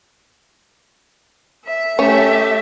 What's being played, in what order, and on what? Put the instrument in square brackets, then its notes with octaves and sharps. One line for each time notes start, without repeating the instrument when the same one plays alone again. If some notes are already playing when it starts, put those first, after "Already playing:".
[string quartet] E5
[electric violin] A3 G4 [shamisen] C#4